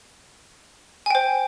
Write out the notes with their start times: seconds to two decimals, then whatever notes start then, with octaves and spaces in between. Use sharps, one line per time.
1.06 G#5
1.10 G5
1.15 C5